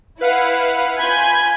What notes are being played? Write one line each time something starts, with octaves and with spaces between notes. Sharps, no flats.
E4 B4 F5 F#5
F4 G#5 B5 G6 G#6 D#7